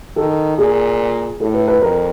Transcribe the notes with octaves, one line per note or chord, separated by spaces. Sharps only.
D#3 A4
A#2 G#4
A2 A4
B4
B4
F2 A#4